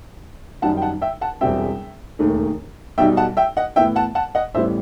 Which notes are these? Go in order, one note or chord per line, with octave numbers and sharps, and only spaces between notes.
F#2 D#3 G3 D#4 F#5 A5
G5
F#5 A5
E5 G5
F#5 A5
E1 E2 B2 G3 C4 E5 G5
E1 D#2 D#3 A3
B1 B2 G3 D#4 E5 G5
F#5 A5
E5 G5
D#5 F#5
A2 E3 B3 E4 E5 G5
F#5 A5
F#5 A5
D#5 F#5
A1 A2 E3 G3 B3 C5 E5